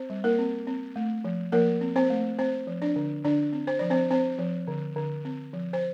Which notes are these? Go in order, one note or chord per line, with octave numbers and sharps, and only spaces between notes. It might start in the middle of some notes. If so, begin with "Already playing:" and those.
Already playing: C4 C5
G3
A#3 A#4
C4
C4
A3
F3
F3 A#3 A#4
C4
C4 C5
A3
C4 C5
F3
D4 D5
D3
D3 D4 D5
C4
C5
F3 D5
C4 C5
C4 C5
F3
D3
D3
C4
F3
C5